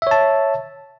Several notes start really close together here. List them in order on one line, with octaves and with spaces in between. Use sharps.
E5 C#5 A5